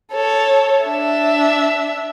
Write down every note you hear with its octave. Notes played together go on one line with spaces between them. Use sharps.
A4 C#5
D4 E5